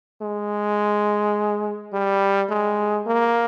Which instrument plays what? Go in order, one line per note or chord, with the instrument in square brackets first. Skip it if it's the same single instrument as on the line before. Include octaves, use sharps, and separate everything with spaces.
[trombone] G#3
G3
G#3
A#3